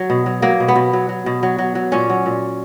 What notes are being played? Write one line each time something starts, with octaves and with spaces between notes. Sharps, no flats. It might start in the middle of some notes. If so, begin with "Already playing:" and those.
Already playing: F#3
B2
F#3
F#3 A#3
B2
B3
B2
F#3
F#3
B2
F#3
F#3
F#3
A#2 C#4
F#3
A#2